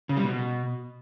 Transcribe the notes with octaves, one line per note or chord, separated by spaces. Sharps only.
C#3
G3
B2